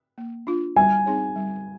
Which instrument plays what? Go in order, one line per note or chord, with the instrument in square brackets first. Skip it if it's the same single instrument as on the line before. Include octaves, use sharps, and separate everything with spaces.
[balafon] A#3
D4 F4
[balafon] G3 [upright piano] G#5
[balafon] C4 D#4 G#4 C#5
G3